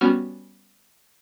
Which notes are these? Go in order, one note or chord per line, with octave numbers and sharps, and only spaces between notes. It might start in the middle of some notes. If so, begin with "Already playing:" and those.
G3 B3 C#4 F#4 F6